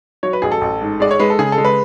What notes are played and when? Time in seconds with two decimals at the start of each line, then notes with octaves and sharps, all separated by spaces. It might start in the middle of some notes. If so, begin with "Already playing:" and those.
0.23 F#3 C#5
0.33 B4
0.42 A1 G#4
0.52 A4
0.61 A1
0.81 G#2
1.00 G#3 D5
1.11 C#5
1.20 G#3 B4
1.30 A4
1.39 C#3 G#4
1.52 A4
1.58 G#3
1.65 B4